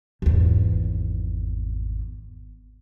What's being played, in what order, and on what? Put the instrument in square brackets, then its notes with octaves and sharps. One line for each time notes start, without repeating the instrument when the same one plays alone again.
[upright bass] G#1 E2